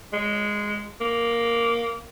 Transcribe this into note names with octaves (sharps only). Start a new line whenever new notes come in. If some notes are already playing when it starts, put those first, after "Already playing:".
G#3
A#3